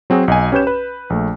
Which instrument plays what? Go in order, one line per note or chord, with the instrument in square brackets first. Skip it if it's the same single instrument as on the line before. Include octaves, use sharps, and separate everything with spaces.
[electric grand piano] F#3 C4 F#4 G#4
B1 D#5 G#5
C#4 G4 B4 C#5 G6 E7
B4
A#1 A3